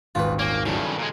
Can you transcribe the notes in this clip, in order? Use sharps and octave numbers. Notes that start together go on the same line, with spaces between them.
D#1 G#1 F4 B4
A#3 C#4
G2 C#3 F#3 E4 G4 A4
A#2 G#3